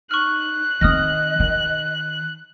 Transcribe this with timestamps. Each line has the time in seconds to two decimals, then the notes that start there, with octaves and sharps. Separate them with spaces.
0.11 D#4 C#6 F6 F#6
0.81 D#3 C4 D#5 D#6 F6 A#6
1.40 D#3